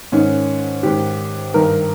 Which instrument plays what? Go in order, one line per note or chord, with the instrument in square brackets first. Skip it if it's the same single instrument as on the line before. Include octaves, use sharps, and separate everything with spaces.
[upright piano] G#2 D#3 C#4
G#2 D#3 G4
G2 D#3 A#4